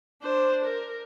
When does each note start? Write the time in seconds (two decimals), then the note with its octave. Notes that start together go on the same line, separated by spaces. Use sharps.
0.22 D4 C5
0.65 A#4